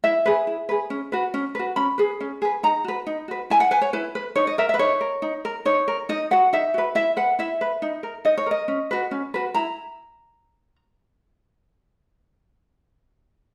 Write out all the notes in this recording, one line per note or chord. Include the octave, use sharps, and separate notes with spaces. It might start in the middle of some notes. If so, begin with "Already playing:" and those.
E4 E5
G#4 B4
E4
G#4 B4
C#4
F#4 B4
C#4
F#4 B4
C#4 B5
G#4 B4
C#4
G#4 B4
D#4 A#5
F#4 B4
D#4
F#4 B4
E4 G#5
F#5
B4 G#5
C#5
E4 B4
B4
D#4 C#5
D#5
A#4 E5
E5
B4
D#4 C#5
A#4
D#4
A#4
D#4 C#5
A#4
D#4 D#5
F#4 B4 F#5
D#4 E5
F#4 B4
E4 E5
B4 F#5
E4 E5
B4
D#4
A#4
D#4 D#5
C#5
A#4 D#5
C#4
F#4 B4
C#4
F#4 B4
E4 A#5